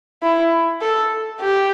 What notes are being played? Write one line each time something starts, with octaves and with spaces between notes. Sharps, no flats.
E4
A4
G4